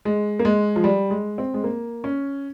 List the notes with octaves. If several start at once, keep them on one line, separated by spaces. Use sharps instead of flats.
G#3
A#3
G#3
F3
G3
G#3
C4
G#3
A#3
C#4